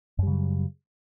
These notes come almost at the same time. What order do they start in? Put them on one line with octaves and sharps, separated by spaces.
F#2 G3 C#3 F#3